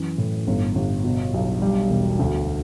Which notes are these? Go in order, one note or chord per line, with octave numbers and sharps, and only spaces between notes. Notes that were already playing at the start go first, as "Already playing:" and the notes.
Already playing: F#2 E3
A2
G1
G1
B2
B1
G3
E1
D2